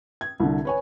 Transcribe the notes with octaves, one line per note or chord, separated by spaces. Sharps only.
G#6
C2 D3
B4 C#5 G#5